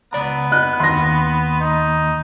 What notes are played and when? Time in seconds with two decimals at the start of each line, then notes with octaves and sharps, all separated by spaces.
0.13 C#2 B3 D5 A#5
0.52 D#5 F#6
0.80 D#2 C6 A#6
1.61 D#4